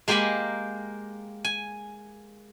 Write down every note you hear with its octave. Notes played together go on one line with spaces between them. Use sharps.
G#3 A#3 G4 A#4 G#5 B5
G#5